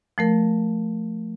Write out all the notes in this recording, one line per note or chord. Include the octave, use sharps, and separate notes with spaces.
F3 A3 A#4